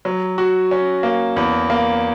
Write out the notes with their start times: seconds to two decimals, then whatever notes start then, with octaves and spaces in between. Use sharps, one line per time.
0.05 F#3
0.38 F#4
0.71 C#4
1.03 A#3
1.36 E2
1.70 A#3